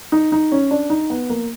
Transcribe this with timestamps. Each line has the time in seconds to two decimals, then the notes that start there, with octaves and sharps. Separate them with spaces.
0.12 D#4
0.32 D#4
0.52 C#4
0.71 D4
0.90 D#4
1.10 B3
1.29 A#3